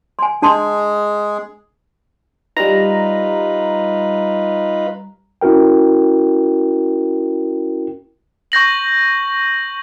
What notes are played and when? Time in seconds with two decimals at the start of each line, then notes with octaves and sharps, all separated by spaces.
0.19 G#5 C6
0.42 G#3 D4 G#4 A5 C6
2.57 G3 D#4 F4 B4 A#5
5.41 C#4 E4 F#4 A#4 G5
8.52 C#6 G6 A#6 F#7